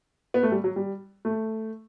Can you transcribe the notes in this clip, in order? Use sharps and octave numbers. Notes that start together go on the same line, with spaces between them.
B3
A3
G3
F#3
G3
A3